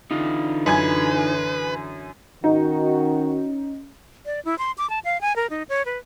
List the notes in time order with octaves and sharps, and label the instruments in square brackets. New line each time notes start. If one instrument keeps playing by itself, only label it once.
[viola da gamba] D3 E3 [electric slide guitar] D#4 F4
[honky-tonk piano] F#2 G#5 G#6 [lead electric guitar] B4
[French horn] D#3 [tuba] C#4 [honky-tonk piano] D#4 [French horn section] F#4
[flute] D5
E4
C6
D6
A5
F5
G#5
A#4
D#4
C#5
B4